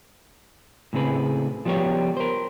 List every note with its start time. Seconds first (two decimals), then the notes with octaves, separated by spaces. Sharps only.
0.93 A2 C#3 C4 G#4 B4
1.65 F3 G3 B3 G4 C#5
2.17 A#4 C5